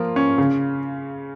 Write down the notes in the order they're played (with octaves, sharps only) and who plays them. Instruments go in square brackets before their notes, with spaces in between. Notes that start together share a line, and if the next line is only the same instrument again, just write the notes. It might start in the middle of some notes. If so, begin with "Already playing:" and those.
Already playing: [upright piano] F3 A#3 F4
C#4
C#3